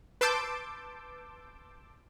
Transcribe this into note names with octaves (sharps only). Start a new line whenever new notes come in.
B4 A5 C6 D6 E6 G6